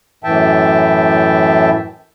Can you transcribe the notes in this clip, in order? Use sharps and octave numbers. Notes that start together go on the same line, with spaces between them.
F#2 A2 E3 E5 G5 A5